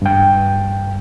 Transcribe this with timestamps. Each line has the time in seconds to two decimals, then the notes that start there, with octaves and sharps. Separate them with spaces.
0.02 G2 G5